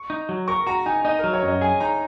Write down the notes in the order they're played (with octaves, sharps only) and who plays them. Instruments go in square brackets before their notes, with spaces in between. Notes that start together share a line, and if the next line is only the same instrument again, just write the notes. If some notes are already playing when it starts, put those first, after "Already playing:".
Already playing: [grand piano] C#6
[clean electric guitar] D#4
F#3
[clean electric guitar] A#4 [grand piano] C#6
[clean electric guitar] F#4 [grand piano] A#5
[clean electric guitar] D#4 [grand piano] G#5
[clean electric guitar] D#4 [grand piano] D#5
[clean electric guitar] F#3 [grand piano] A#4
[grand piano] C#5
[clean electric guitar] F#2 [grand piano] D#5
[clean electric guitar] G#4 [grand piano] G#5
[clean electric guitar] D#4 [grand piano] A#5